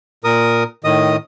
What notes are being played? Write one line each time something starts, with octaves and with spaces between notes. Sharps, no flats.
A#2 A#4 D#6
A2 D#3 D#5 D#6